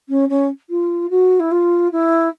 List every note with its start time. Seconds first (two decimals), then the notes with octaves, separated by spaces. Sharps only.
0.09 C#4
0.29 C#4
0.70 F4
1.10 F#4
1.39 E4
1.51 F4
1.92 E4